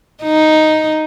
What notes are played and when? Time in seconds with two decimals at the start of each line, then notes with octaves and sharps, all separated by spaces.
0.23 D#4